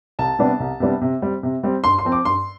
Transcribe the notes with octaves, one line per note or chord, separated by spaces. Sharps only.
C2 A5
C3 G3 B3 D4
C2
C3 G3 B3 D4
C3
G3 C4
C3
G3 C4
G2 C6
C6
F3 C4
D6
G2 C6